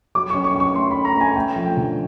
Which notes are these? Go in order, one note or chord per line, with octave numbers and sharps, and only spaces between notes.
F#3 D6
C#4 C#6
C#6
C#4
C#6
A3 C6
C#4 B5
A#5
A3 G#5
A3 G5
F3
G5
D3